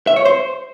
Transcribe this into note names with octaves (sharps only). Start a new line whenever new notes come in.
E5
C#5
C5